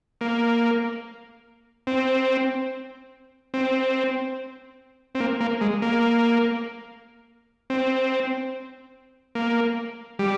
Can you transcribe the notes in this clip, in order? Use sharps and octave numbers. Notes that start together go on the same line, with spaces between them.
A#3
C4
C4
C4
A#3
A#3
G#3
A#3
C4
A#3
G3